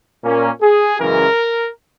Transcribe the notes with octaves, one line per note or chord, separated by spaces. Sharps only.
A#2 A#3 C#4
G#4
F#2 C#3 E3 G#3 C#4 A#4